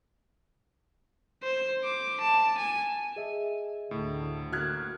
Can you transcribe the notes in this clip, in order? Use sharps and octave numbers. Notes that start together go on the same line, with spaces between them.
C5
D6
A5
G#5
G#4 D#5 E5
D2 A2 D3
A#3 F#4 F6 F#6 G#6